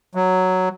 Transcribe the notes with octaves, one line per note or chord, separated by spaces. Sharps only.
F#3